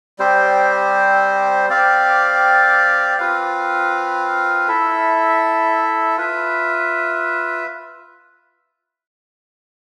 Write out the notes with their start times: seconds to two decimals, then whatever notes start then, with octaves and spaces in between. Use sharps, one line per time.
0.19 G3 C4 G4 C5
1.69 C4 G4 D5 F5
3.18 C4 F4 B4 F5
4.68 E4 A4 E5
6.17 F4 B4 E5